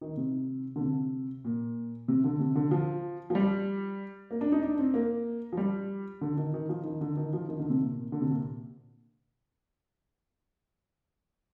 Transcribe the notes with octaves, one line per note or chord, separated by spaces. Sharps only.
D#3
C3
D3
C3
A#2
C3
D3
C3
D3
F3
F3
G3
A#3
D4
D#4
D4
C4
A#3
F3
G3
D3
D#3
D#3
F3
D#3
D3
D#3
F3
D#3
D3
C3
A#2
D3
C3
A#2